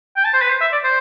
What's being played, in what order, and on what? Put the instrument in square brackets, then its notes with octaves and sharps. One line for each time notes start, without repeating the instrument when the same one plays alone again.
[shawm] G5
A5
C5
B4
C5
E5
D5
C5